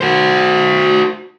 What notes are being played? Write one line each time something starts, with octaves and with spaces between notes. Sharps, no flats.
F#4 C5